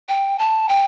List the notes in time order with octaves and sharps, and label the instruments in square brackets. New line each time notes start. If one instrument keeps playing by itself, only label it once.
[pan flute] G5
A5
G5